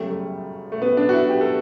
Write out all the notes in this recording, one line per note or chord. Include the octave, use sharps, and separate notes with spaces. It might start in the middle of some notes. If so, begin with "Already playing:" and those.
Already playing: G1 F#2 C#3 G3 A3
A3
A3
B3
D4
F#4
E4
G4
A4